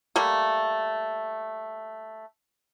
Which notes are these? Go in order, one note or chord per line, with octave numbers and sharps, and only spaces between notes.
G3 A3 A#3